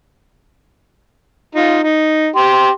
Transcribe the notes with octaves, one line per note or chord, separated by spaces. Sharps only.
D#4 F4
D#4
G4 C6